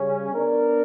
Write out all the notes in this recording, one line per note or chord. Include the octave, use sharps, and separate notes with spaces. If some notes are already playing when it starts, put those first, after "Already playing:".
Already playing: C#3 G3 C#4
B3 D4 A#4 D5